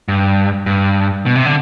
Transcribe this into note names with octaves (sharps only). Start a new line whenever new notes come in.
G2
G2
B2
C3
D3